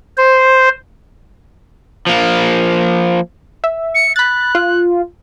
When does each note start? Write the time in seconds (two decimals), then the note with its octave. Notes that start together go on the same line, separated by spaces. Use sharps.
0.17 C5
2.07 F3 A#3
3.64 E5
3.95 C#7
4.16 B5 F#6 A6
4.55 F4